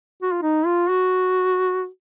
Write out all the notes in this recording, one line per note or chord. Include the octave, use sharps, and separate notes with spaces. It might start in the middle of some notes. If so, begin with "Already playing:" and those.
F#4
F4
D#4
F4
F#4